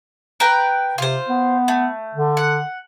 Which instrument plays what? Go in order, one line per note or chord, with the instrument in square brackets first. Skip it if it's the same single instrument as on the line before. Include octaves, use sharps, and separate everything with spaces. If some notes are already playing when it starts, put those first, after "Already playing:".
[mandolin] A#4 B4 G5
[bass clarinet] C3 [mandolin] F4 C5
[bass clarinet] B3
[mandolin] A3
[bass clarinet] D3
[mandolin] F#5